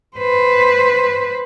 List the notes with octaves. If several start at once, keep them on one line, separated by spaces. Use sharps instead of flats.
B4 C5